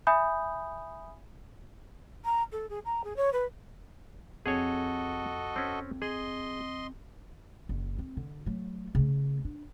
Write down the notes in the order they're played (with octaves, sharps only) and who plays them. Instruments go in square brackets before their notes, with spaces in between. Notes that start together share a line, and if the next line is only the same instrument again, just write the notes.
[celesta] E5 G#5 B5 D#6 G6
[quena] A#5
A4
G#4
A#5
G#4
C#5
B4
[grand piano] F2 [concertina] F#4 A4 D#5 [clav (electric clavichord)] G#4 C#5
[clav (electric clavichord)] C4 C#4
[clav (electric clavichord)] G#4 [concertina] D#5 C6
[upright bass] F#1
C4
D3
F#3 A3
C#3 A3
D4